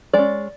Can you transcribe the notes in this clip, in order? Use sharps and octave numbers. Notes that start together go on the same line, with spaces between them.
G#3 C#4 D5